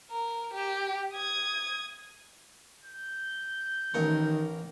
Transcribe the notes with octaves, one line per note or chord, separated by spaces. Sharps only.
A#4
G4
D#6 G#6
G6
A1 D#3 A#4 C#6